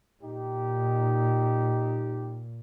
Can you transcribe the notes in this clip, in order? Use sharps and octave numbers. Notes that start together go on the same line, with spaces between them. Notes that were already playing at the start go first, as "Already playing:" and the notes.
A#2 D#4 G4